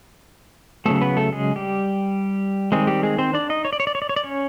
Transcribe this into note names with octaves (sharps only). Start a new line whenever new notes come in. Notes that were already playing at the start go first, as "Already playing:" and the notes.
C#3 F#3 A3 B3 A4
B3 B4
A3 A4
G#3 G#4
G3 G4
D#3 G3 G#3 C4 G#4
G3 G4
G#3 G#4
C4 C5
D4 D5
D#4 D#5
C#5
D5
C#5
D5
C#5
D5
C#5
D5
C#4 C#5